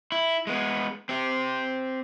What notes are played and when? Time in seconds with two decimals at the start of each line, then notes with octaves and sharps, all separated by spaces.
0.12 E4
0.47 G#3 B3
1.09 C4 G4